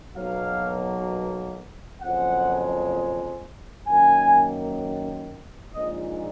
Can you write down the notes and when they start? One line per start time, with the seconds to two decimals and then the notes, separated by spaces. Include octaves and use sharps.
0.16 B1 B2 F#3 A#3 F5
2.02 F#1 F2 F3 G#3 F#5
3.88 F#2 D#3 A#3 G#5
5.74 A#1 A#2 G#3 D#4 D#5